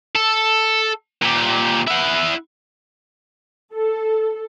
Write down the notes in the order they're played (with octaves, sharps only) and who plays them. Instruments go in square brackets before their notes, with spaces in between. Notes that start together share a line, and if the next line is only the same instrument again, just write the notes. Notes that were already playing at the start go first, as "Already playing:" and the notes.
[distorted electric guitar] A4
A#2 G4
E4 F#5
[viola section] A4